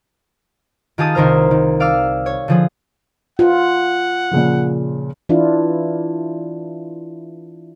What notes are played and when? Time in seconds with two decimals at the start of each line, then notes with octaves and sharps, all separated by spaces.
0.98 D#3 F4 G4 G#4 A5 D#6
1.15 C2 D#3 A#4 C5 F6
1.51 D#3
1.80 D5 F5 D6 E6 F6
2.26 C#5
2.48 D3 F3 G#4
3.39 F4 F#5
4.31 A#2 C#3 F3
5.29 E3 D4 E4 F4